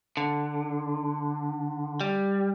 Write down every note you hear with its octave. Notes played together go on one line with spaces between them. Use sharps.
D3
G3